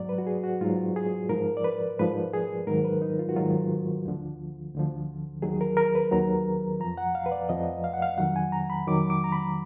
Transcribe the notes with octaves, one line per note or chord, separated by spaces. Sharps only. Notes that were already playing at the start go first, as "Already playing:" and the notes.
Already playing: G#2 F#3 D5
B4
F#4
G#4
F#4
G#2 F#3 F4
G#4
G#2 F3 A#4
D5
B4
G#2 F3 B4
G#4
G#2 D#3 F#3 A#4
B4
D#4
F4
F#4
G#2 D#3 F#3 F4
D2 D3 F3
D2 D3 F3
D#2 D#3 F#3 G#4
A#4
A#4
B4
D#2 D#3 F#3 A#5
F2 F3 A#5
F#5
F5
B4
D5
F2 F3 D#5
F5
F#5
F5
F2 D#3 F#3 F#5
G#5
A#5
B5
F2 D#3 F#3 D6
D6
A#5
B5